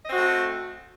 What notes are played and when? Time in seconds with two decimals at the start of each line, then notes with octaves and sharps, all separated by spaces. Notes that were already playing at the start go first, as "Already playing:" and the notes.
0.03 D#5
0.08 C4
0.13 F#4
0.18 A3